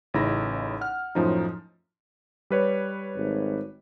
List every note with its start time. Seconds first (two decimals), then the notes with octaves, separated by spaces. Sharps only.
0.14 A1 C#3 D#4 E4 B5 A#6
0.81 F#5 F6
1.15 F#2 A2 F3 C#4 D#4
2.50 G3 B4 C#5
3.17 G#1